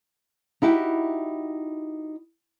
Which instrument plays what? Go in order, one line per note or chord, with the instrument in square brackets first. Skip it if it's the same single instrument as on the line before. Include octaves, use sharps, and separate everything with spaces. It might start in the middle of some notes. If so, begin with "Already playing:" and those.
[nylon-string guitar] D#4 E4 F#4 G4